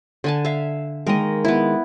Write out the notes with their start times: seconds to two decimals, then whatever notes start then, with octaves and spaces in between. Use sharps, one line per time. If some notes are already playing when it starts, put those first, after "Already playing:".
0.24 D3 G#5 A5
0.45 E5 F5
1.07 D#3 G#3 A#3 A#4 D#5
1.45 B3 E4